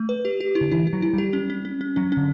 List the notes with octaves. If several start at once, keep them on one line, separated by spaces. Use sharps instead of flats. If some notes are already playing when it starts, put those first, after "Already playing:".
Already playing: A3
B4
G4
G4
E4
D3
E3 E4
E4
F#3
E4
G3
G4
C#4
C#4
C#4
C#4
F#3 C#4
D3 C#4